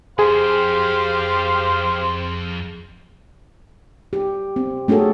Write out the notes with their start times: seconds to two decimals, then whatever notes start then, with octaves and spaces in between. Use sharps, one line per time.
0.19 F2 G4 G#4 C5 F5
4.13 G4
4.56 C4
4.88 A3 C#4 F#4 G#4 A4